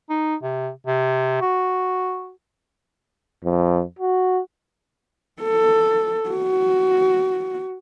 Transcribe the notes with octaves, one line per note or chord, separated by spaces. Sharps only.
D#4
C3
C3
F#4
F2
F#4
A4
F#4